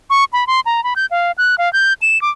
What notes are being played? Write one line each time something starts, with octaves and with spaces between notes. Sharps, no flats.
C#6
B5
C6
A#5
B5
G6
F5
F#6
F5
G6
E7
D6